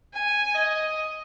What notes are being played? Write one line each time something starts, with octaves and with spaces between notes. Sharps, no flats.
G#5
D#5